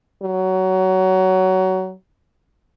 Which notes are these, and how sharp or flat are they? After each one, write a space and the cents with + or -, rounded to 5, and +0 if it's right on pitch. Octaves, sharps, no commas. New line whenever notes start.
F#3 +20